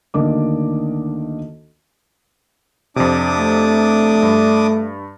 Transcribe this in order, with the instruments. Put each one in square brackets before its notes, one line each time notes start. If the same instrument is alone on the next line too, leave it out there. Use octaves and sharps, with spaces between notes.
[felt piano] D2 D#3 A#3 D4 D#5 D6
[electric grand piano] F2 C3 [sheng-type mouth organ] D4 D6 D#6
[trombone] A3
[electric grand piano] G2